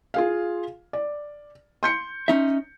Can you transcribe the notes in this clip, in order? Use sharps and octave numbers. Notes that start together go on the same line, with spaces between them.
F4 G#4 F5
D5
C6 G6 C#7
C#4 D#4 E5